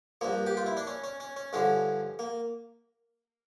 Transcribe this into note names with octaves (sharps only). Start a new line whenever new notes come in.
G2 F3 A#3
G4
F4
E4
D4
C#4
C#4
C#4
C#4
G2 D3 F3 C#4
A#3